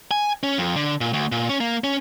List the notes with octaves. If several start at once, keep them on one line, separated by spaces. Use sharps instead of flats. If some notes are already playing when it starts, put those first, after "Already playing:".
G#5
C#4
F2
D3
A#2
D2
A#2
C#4
A#3
C#4